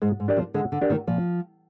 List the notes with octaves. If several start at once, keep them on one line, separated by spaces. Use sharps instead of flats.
G#2 G#3
G#2
D4 G4 A#4 D5
F3
D3 G#3
D3
D4 G4 A#4 D5
D#3
A#2 F3